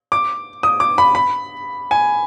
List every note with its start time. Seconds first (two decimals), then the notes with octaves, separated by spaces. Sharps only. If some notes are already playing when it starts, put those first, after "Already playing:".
0.12 D6
0.63 D#6
0.80 D6
0.98 B5
1.15 B5
1.91 G#5